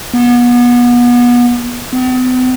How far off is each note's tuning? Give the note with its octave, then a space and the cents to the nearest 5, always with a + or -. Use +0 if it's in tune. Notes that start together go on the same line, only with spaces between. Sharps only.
B3 -30
B3 +45